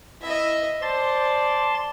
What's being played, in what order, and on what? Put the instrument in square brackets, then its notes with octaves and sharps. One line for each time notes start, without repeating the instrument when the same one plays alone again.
[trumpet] E4 [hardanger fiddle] D#5 E5
[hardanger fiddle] C5 [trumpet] D5 [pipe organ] A5 C6 A6